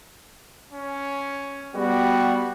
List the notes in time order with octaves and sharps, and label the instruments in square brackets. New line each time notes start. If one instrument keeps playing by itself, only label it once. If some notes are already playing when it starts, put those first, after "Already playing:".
[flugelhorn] C#4
[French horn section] G3 B3 [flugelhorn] F#4